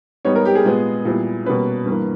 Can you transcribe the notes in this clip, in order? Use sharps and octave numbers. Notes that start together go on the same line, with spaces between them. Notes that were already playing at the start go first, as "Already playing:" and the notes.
G#2 G3 B3 D#4 C#5
A#4
G4
G#4
A#2 G#3 B3
A#2 G3 B3 E4
B2 G3 A#3 C#4 B4
G2 E3 A#3